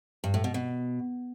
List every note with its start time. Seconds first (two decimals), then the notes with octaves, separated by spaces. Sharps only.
0.24 G2
0.34 A2
0.44 B2
0.54 B2